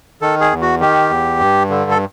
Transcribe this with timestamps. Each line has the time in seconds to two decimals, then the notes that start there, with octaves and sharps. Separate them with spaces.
0.21 D#3 A4
0.41 G#4
0.51 E2
0.62 F#4
0.80 D#3 G4
1.10 E2
1.40 G2
1.70 D3
1.91 A4